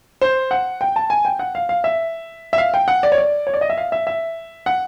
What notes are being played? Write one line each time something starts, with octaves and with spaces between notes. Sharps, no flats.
C5
F#5
G5
A5
G#5
G5
F#5
F5
F5
E5
E5
F5
G5
F#5
D5
C#5
D5
C#5
D5
D#5
E5
F5
E5
E5
F#5